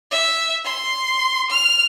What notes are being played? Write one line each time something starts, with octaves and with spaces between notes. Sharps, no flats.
E5
C6
F6